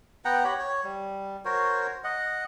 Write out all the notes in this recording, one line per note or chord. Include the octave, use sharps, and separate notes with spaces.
B3 F#5 G5 A#5
G4 C#5 B5
C#5
G3
F#4 A#4 C5 C#5
D#5 F#5